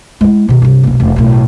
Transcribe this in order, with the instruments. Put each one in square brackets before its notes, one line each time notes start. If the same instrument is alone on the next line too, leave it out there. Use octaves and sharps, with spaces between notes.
[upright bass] G#3 E4
B2 D#3
G2 C3
F#1 B1
F1 F2
B1 A2